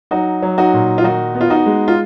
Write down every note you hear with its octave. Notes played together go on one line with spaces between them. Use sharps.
F#3 D#4 F#4
F#3
D#4 F#4
A#2
F4
D#3 D#4 F#4
B3
F4
D#4 F#4
G#3
F4